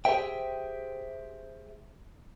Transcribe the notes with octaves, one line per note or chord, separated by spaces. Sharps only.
G4 G#4 B4 C5 E5 G5